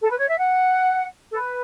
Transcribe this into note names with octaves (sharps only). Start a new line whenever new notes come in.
A4
B4
C#5
E5
F#5
A4
B4